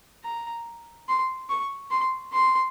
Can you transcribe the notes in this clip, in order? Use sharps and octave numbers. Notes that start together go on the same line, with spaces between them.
A#5
C6
C#6
C6
C6